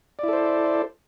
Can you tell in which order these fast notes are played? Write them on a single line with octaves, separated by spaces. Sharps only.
D5 E4 A4 C5